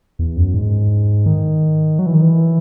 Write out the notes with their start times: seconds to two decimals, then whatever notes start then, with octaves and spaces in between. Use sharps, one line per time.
0.19 E2
0.37 F#2
0.54 G#2
1.26 D#3
1.99 F#3
2.06 E3
2.15 D#3
2.22 E3